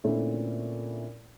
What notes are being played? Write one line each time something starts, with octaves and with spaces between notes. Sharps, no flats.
A#2 D3 A3 C4 C#4 E4